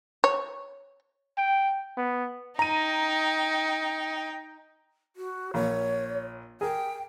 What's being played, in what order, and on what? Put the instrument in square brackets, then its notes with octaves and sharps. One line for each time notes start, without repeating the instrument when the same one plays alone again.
[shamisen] C#5
[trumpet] G5
B3
[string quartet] D#4 G5 [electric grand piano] A#5 D#7
[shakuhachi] F#4
[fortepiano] A#1 [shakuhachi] C#5
[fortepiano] G#4 A#4 [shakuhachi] G5